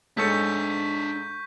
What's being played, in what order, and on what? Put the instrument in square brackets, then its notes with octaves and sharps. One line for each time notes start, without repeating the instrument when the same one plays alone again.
[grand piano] G#2 A4 C#7 [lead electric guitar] D4 C#5 [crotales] C#6 G6 B6